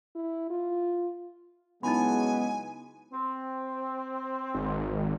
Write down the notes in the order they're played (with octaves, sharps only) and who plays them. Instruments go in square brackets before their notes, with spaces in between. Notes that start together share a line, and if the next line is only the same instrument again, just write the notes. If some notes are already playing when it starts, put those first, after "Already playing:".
[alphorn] E4
F4
[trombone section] C#3 F#3 G#3 [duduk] B3 [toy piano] D#4 E4 B5 [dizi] G#5
[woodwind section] C4
[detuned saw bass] G#1